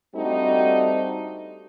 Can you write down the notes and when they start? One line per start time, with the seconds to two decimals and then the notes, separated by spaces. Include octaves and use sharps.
0.15 G3 A3 C4 D4 D#4 F#4